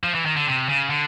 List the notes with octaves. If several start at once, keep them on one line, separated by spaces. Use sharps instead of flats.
F3
E3
D#3
D3
C3
C#3
D3